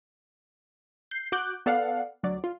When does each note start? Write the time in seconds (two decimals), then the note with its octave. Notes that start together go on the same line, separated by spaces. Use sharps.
1.11 G6 C7
1.32 F#4 D6 F#6 G6
1.66 B3 A4 D5 F5 F#5
2.23 D2 F#3 D5
2.44 F4